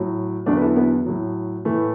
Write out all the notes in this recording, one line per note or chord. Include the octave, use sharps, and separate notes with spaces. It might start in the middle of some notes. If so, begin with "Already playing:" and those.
Already playing: A2 F#3
E2 D3 F#3 A3 D4
B4
E4 A4
B3 E4
A2 F#3
A2 E3 A3